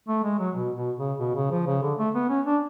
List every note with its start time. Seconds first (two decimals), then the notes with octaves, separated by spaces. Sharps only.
0.08 A3
0.24 G#3
0.39 F#3
0.55 B2
0.76 B2
0.98 C#3
1.19 B2
1.35 C#3
1.51 F3
1.66 C#3
1.82 D3
1.98 A3
2.14 B3
2.30 C#4
2.46 D4